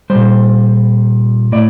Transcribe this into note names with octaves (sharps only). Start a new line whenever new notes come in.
G3 C5
A#2
A2 D5